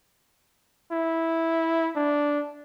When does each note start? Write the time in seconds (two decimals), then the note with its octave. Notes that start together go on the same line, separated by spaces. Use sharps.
0.92 E4
1.96 D4